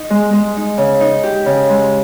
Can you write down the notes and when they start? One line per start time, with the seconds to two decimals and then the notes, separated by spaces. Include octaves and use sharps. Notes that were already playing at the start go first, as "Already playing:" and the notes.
Already playing: D#4
0.10 G#3
0.33 G#3
0.56 D#4
0.78 C#3
1.00 D#4
1.23 G4
1.46 C#3
1.69 G#3